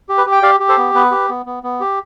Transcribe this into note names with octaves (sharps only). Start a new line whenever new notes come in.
G4
B4
G4
G5
G4 D5 F5
G4
A4 C5
B3
B3 B4
G4
B3
B3
B3
G4